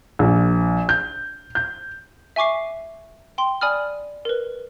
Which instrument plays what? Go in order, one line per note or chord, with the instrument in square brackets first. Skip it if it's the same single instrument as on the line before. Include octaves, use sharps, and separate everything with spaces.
[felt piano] A#1
G6
G6
[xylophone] E5 G#5 C#6 D6 C7
G5 C6
D5 G#5 B5 D#6 F6
A#4 B4